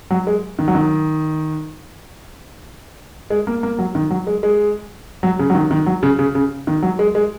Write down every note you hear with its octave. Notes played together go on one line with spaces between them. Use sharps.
F#3
G#3
D#3
F#3
D#3
G#3
A#3
A#3
F#3
D#3
F#3
G#3
G#3
F#3
C#3
F#3
D#3
D#3
F#3
C#3
C#3
C#3
D#3
F#3
G#3
G#3